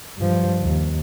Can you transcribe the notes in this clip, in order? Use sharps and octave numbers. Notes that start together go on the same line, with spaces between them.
G2 F3
D#2